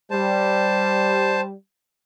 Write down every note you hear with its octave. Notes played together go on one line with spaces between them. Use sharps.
G3 C5 A5